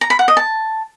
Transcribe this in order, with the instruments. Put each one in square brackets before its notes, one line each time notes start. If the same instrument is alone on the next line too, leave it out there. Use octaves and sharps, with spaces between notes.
[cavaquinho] A#5
B5
F#5
D#5
A5